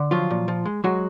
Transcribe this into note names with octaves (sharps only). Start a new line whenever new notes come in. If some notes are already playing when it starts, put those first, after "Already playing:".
Already playing: D3
F3 F#3 F4
A#2
F3
G#3
F#3 G#3 F#4